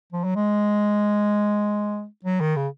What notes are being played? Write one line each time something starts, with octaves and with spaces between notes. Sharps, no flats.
F3
F#3
G#3
F#3
D#3
C#3